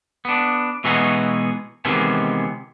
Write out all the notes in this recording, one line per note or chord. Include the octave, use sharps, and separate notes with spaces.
B3 D4
B2 E3 G#3 B3 D#4 F#4
C3 D#3 E3 G#3 B3